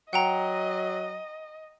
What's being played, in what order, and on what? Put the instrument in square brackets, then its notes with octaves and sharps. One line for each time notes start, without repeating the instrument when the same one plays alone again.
[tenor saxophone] F#3 [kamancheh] D#5 [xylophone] F#5 G5 A#5